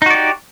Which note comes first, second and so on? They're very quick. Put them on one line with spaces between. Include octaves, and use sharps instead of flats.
D#4 F#4 D5 G4